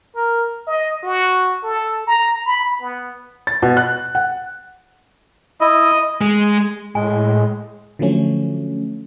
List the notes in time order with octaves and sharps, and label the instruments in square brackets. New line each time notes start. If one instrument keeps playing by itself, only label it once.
[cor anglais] A#4
[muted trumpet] D#5
F#4
A4
A#5
B5
B3
[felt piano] A6
B2
F#6
F#5
[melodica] E4 [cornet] D#5
[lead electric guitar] G#3
[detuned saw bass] A2 [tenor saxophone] G#3 [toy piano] G#5
[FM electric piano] D3 F3 F#3 A3 C#4